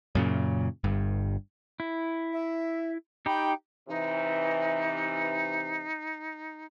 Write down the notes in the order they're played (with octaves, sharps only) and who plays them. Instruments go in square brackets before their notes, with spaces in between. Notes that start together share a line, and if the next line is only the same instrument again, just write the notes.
[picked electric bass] F#2 A#2 C#3
G1 G2
[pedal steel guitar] E4
[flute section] E5
[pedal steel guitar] D#4 G4 [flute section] G5 B5
[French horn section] C3 E3 [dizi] D#4